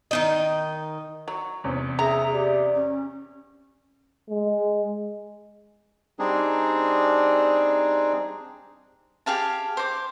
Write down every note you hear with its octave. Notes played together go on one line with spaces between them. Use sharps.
D#3 D#4 D#5
F#3
E2 C3 C#4
G#4 E5 A#5
G4 D5
C#4
G#3
G3 C4 D4 D#4 G#4
G4 G#4 F5 A5
C5 D6